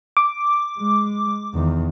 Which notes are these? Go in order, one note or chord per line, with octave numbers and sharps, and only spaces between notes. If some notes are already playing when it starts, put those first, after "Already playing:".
D6
G#3
E2 D#3